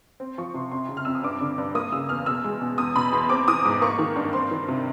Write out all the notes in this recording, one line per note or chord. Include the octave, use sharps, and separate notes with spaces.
C4
F3 C#6
C3 C6
F2 C6
C#3
F6
F2 E6
D#6
G2 D6
D3
G2
A#3 D#6
C#3 E6
E2 F6
B2 E6
G#3
B2
E2 D#6
B2 B5
E2 C6
C4 D6
E3 D#6
G#2 D6
A#3 C#6
D#3
G2
C4 C6
D#3
C3